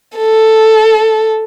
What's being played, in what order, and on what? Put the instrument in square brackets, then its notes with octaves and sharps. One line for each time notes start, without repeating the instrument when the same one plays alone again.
[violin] A4